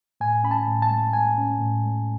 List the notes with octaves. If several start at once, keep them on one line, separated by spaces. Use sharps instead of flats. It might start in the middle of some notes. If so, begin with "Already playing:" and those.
A2 G#5
C#4 B5
A5
A2
A5
G#3
A2 G#5
C#4
A2
G#3